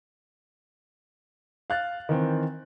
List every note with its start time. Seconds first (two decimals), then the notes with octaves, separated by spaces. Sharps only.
1.70 F5 F#6 A6
2.09 D#3 E3 C4